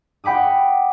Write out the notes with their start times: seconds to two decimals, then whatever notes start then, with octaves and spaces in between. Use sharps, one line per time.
0.24 F#5 G5 B5 D6 D#6